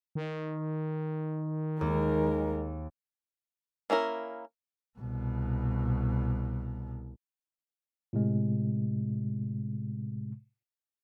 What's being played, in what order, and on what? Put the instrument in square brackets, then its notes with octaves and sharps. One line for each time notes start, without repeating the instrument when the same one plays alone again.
[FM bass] D#3
[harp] D#2 [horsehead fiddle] G#3 A#4
[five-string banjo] A#3 C#4 E4 A#4
[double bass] C2 B2
[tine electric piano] A2 C3 G#3